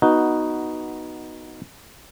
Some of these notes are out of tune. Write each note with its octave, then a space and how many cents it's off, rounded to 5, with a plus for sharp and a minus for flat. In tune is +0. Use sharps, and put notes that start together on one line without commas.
B3 -10 D#4 +0 F#4 +0